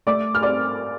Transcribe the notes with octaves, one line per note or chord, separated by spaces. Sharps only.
A3 D5 D6
F6
C4 D5 D6